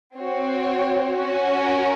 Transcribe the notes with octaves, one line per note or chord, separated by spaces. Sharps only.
C4 F#4 C#5
C#4 F#4
A#4